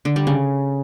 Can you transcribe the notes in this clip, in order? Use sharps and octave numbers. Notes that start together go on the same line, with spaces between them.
D3
G3
C#3